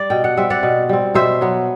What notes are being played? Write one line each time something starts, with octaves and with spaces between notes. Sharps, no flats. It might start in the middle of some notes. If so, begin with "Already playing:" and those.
Already playing: G3 D5
B2 G5
F#5
G3 C4 E5
D5 F#5
B2
G3 C4
B2 C5 E5
F#3 B3